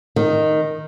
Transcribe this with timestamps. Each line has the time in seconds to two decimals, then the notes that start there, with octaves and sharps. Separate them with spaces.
0.16 D#3